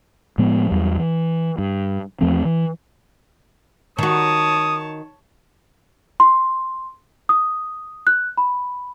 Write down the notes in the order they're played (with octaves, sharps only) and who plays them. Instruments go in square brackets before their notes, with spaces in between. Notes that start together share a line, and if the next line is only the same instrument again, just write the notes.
[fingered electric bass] A2 F3 G#3 B3
E2 F#3 G3
E3
G2
E2 F3 A3 C4
E3
[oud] D#3 F#4 [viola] C#5 A5 [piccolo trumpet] D#6
[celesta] C6
D#6
F#6
B5